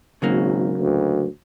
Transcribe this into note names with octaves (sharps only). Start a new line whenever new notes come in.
G#1 C#3 F#3 A#3
D2